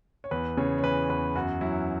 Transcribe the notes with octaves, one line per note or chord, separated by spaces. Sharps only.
C#5
E2 B4
C#3 C#5
C#5
E3 B4
E2 B4
F#2 F#4
F#3 E4